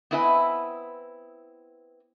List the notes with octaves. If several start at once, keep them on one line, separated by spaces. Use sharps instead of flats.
B3 C4 E4 B4 D#5 G#5